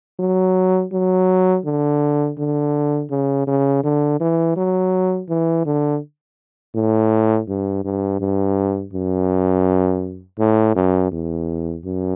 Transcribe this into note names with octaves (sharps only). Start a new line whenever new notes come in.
F#3
F#3
D3
D3
C#3
C#3
D3
E3
F#3
E3
D3
A2
G2
G2
G2
F#2
A2
F#2
E2
F#2